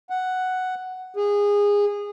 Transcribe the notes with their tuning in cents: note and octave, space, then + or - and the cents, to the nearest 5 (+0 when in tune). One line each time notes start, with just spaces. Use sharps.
F#5 +5
G#4 -20